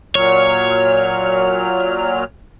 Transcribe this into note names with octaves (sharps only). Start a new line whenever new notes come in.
A#2 F#3 C#5 F6